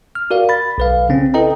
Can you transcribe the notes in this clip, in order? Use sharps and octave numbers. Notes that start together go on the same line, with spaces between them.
F6
F#4 A#4 D5 F5
B5 A6
B1 B4 F5
C#3 C4 C#4
E4 A4 B4 D#5 G5 A#5